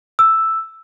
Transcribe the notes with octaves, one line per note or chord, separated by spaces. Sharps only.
E6